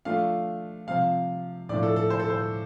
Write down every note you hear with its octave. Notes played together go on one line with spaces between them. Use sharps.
F3 A3 D4 F4 F5
C3 F3 C4 F5
A2 F3 D4 D5
A4
A4
C5
A4
C5